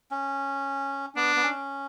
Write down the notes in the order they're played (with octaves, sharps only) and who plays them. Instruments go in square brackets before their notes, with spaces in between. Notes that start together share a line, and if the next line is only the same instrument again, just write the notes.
[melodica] C#4
[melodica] B3 [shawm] D4
[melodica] B3
C#4